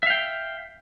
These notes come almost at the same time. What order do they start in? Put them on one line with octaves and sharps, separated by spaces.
E5 F5 G5